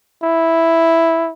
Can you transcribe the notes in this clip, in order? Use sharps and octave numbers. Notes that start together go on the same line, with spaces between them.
E4